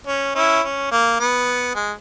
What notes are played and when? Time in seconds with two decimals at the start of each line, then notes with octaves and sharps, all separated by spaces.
0.07 C#4
0.35 C#4 E4
0.63 C#4
0.91 A#3
1.19 B3
1.75 G#3